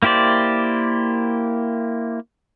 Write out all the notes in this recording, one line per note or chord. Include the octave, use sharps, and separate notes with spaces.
A#3 E4 G4 C5 D5